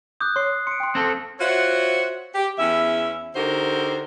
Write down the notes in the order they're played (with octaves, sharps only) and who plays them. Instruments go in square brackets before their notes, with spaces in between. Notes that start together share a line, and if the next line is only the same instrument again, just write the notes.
[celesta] D6 G6 [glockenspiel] D#6 F#6
[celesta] C#5 [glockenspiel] C6 C7
[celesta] C6 [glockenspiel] C#7 D7
[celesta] G5 C6
[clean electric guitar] C4 A4
[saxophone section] F4 F#4 C5 C#5 E5 F#5
G4
E2 C#4 E4 E5
D3 D#4 F#4 G4 A#4 C5